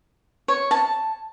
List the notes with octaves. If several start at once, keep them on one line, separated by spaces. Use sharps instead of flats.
C#5
A5